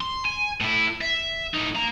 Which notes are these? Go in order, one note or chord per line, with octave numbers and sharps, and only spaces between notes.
C6
G#5
A2 E4
E5
A2 D#4
A#3 A#5